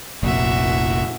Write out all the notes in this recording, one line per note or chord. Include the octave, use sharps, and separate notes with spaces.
F1 A#1 F#4 E5